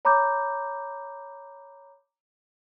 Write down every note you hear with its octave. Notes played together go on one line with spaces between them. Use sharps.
C#5 A#5 B5 D6 G6